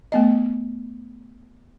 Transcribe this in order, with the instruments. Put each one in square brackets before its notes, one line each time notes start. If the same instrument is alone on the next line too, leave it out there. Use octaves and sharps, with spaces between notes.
[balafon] A3 B3 D#5